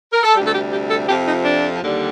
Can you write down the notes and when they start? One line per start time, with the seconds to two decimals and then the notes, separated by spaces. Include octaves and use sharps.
0.12 A#4
0.23 A4
0.35 D2 C3 G3 G4
0.46 A4
0.54 G4
0.72 G4
0.90 A4
1.08 F2 C3 F3 G4
1.26 D#4
1.45 D4
1.81 D#2 D3 G3